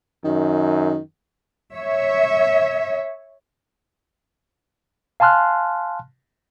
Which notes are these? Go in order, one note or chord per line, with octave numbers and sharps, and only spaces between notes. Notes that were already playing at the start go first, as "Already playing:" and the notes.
F#2 D#3
C#5 E5
F5 G#5 A5 C6 F6 F#6